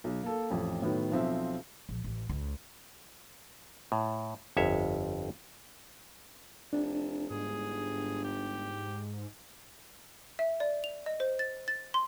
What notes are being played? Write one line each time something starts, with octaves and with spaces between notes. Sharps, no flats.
B1
A#3 A4
A1 F2
A2 D#3 F#3 B3
B1 F3 C4 E5
A#1
A1
C#2
A2
G1 F2 C#5 E5
F1 D4
G1 G#2 G#4
G4
E5
D5
F7
D#5
C5
A6
A6
C6